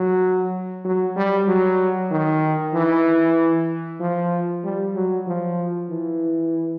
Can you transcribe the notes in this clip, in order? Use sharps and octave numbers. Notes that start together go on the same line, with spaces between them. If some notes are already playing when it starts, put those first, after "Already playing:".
Already playing: F#3
F#3
G3
F#3
D#3
E3
F3
G3
F#3
F3
E3